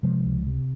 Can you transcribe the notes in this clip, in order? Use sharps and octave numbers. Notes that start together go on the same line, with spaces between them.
C3 F3 G#3
C#2
C3